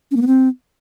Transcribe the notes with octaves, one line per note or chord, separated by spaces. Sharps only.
C#4
A#3
B3
C4